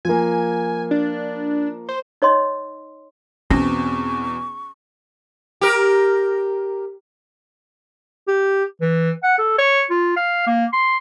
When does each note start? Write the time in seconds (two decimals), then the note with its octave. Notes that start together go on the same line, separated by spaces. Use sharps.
0.05 F3 A#3 G#5
0.91 D4
1.89 C5
2.22 D#4 C#5 D#5 C6
3.51 E2 B2 C4 C#4 C#6
5.61 G4 A#4
8.28 G4
8.81 E3
9.24 F#5
9.38 A4
9.58 C#5
9.90 F4
10.17 F5
10.47 A#3
10.73 C6